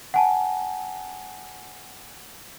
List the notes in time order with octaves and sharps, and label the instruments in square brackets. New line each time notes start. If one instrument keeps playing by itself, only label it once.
[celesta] F#5 G#5 A5